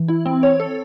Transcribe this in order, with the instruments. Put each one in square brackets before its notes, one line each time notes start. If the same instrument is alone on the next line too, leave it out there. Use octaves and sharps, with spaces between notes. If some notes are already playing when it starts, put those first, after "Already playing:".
Already playing: [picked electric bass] E3
[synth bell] E4
C4
C#5
A4